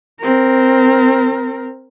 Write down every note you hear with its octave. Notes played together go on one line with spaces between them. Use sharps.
C4 A#4